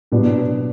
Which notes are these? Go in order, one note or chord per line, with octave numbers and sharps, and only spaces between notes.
B2 F#3 B3 D4